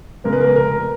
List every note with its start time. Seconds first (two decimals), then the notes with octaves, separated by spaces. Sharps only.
0.24 C#3 G#3 B3 A#4
0.33 B4
0.41 A#4
0.56 F1 A#4